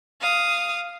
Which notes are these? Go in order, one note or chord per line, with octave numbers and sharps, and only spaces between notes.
F5 D#6